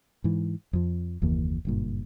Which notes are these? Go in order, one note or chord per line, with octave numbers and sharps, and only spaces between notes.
G#2 E3
F2 F3
F#1 D#2 E3 A#3
F#1 G2 A#2